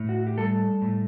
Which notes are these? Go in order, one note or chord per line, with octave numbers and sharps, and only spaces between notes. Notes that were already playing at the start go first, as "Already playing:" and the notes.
Already playing: A2
F#4
G4
G3 A4
A2